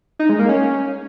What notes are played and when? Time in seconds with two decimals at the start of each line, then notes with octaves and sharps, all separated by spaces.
0.19 D#4
0.29 G#3
0.39 A#3
0.49 C#4